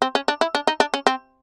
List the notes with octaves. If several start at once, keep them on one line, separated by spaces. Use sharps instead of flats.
C4
C#4
D4
E4
D4
D#4
D4
C#4
C4